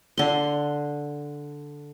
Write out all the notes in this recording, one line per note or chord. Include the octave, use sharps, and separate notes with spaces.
D3 C6